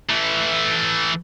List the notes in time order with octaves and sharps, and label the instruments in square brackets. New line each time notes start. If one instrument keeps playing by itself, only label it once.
[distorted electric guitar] E3 A3